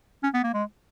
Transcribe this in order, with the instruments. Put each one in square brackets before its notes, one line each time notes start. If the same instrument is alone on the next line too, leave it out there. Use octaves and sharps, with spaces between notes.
[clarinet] C#4
B3
A#3
G#3